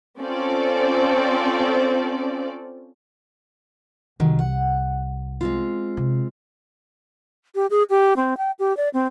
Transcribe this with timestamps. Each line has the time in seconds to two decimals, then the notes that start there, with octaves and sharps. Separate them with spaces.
0.20 C4 C#4 F4 A4 D5
4.20 C2 D#3 F#3
4.39 F#5
5.41 G#3 C4 F4
5.97 C3
7.55 G4
7.70 G#4
7.90 G4
8.17 C4
8.38 G5
8.59 G4
8.77 D5
8.94 C4